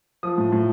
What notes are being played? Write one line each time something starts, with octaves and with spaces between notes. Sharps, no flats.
F3 D#6
A2
A2